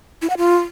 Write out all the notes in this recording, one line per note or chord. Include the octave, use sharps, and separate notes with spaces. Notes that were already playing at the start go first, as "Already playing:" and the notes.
E4
F#5
F4